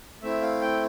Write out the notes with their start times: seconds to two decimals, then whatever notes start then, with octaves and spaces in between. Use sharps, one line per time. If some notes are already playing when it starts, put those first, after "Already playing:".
0.22 A3 C4 E4 E5
0.42 F5
0.62 G5